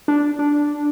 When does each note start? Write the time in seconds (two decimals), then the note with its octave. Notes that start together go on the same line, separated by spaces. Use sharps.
0.08 D4
0.39 D4